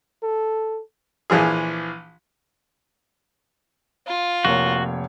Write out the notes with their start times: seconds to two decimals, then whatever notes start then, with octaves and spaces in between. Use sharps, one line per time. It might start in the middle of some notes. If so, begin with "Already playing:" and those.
0.23 A4
1.30 A#1 E3 F3 G#4
4.07 F4
4.45 F1 A#3 F#4 C#5